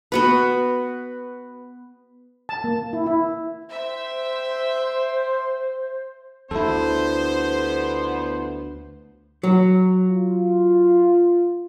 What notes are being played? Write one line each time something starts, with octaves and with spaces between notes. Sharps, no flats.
B3 F#4 B4
A5
A#3
E4
E4
C5 E5 G5
D2 D3 F3 B3 E4 A4 C5
F#3
F4